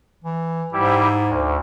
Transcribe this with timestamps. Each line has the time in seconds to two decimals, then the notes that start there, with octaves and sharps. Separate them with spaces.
0.24 E3
0.73 G#2 G3 E4 G4
1.27 D2